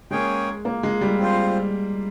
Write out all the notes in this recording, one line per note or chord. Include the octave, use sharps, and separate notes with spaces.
G#3 A#3 C#4 G#4 C#5 G5
A#3
G#3
G3
C4 F4 C5